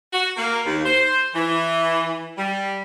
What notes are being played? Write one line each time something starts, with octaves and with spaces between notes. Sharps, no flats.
F#4
A#3
D#2
C5
E3
G3